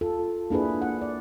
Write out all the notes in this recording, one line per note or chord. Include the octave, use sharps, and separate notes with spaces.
F4 A4
A#3 D4 E4 G#4 B4
F#5
D5